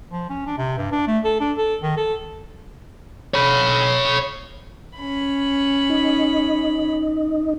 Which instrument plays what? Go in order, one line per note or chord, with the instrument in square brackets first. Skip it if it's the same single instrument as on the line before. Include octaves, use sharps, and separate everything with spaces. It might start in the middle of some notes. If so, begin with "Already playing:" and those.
[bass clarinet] F3
C#4
D4
C3
G2
D4
A3
A4
D4
A4
D#3
A4
[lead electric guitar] C#5 B5
[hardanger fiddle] C#4 B5
[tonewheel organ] D#4